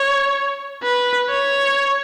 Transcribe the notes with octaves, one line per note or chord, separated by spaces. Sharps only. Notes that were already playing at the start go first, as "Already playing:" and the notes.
Already playing: C#5
B4
C#5